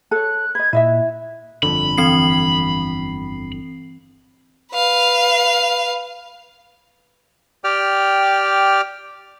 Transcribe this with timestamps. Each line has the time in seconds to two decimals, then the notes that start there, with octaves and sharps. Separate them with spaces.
0.11 A4 C#5 F#6
0.55 B4 D#5 G#6
0.73 A#2 E4 D#5 E5
1.63 G1 F2 D3 B5
1.98 E3 C4 C7
4.73 B4 F5
7.64 G4 D5 G5 F6